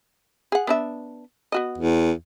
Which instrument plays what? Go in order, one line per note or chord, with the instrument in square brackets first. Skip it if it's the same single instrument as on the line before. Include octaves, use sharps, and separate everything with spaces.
[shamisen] G#4 F#5
B3 D4 E5
B3 F#4 D#5
[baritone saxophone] E2